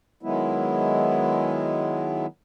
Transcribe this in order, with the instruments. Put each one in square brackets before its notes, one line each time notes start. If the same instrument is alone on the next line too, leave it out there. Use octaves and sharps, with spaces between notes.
[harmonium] D#3 F#3 G#3 B3 E4